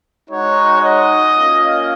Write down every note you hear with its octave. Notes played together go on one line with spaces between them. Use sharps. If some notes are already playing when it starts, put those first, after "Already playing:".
G#3 D#4 F#4 C#5
D#5
A#3 C#4 F4